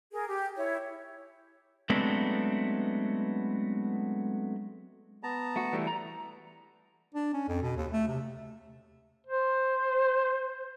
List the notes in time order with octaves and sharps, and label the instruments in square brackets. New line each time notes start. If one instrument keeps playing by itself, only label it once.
[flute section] G#4 A#4
G4
E4 C#5
[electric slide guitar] F#3 G#3 A3 B3 C4 D4
[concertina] B3 A5 A#5
[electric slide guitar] A3 F#4
E3 G3 A3
A#5
[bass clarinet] D4
C#4
F2
B2
D#2
A3
C3
[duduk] C5